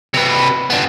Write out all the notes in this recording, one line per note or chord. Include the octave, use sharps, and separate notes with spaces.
C3 B4
B3 D4